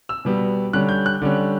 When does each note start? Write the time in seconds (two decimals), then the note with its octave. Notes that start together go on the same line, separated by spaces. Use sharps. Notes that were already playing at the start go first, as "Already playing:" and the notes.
0.09 E6
0.25 B2 G3 B3
0.73 D3 G3 C#4 F#6
0.89 G6
1.06 F#6
1.22 D3 G3 C#4